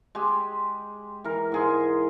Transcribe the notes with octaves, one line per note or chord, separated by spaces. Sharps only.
G#3 G4
E3 A#4
G#2 G#4 C6